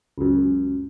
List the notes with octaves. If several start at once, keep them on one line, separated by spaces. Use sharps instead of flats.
C#2 F#2